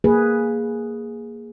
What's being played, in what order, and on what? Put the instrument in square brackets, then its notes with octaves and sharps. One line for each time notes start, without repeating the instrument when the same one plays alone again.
[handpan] A#3 G#4 B4